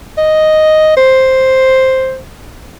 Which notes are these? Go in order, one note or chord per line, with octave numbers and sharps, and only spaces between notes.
D#5
C5